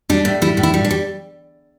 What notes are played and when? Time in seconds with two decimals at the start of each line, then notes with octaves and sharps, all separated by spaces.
0.10 G3 D4
0.25 A2
0.42 G3 E4
0.57 A2
0.63 E4
0.74 G3
0.85 D4
0.91 G3